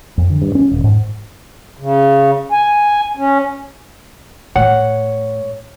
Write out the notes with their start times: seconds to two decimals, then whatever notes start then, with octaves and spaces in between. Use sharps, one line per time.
0.18 F2
0.30 D3
0.42 G2
0.55 C#4
0.71 D#1
0.84 G#2
1.77 C#3
2.52 G#5
3.16 C#4
4.56 A2 C#5 F#5